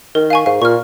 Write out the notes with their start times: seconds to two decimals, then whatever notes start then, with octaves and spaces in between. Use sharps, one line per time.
0.15 D#3 A#4
0.30 F5 G#5 C#6
0.46 G#2 F5
0.61 A#2 C#6 F6